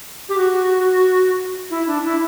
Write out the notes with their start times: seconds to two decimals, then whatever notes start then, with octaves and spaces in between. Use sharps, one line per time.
0.29 G4
0.37 F#4
1.70 E4
1.87 D4
2.04 E4